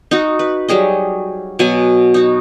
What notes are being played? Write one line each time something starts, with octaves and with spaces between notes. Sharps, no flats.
D#4 F#4
B4
F#3 G3 G#4 D#5
B2 F#3 F#5 G#5
D#4 F#4